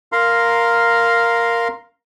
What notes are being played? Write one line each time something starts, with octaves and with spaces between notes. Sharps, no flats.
A#4 F5 A#5 C6